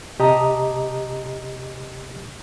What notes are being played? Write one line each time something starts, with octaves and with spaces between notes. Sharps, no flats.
C3 G4 D#5 A5 A#5 D#6